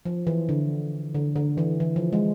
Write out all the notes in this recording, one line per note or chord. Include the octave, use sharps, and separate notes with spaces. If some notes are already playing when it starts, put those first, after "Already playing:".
F3
E3
D3
D3
D3
E3
E3
F3
G#3